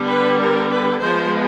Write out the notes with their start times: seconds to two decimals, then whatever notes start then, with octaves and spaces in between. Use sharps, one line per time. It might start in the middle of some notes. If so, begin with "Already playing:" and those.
Already playing: D3 G3 B3
0.09 B4
0.39 A#4
0.70 B4
1.00 F3 G#3 B3 C5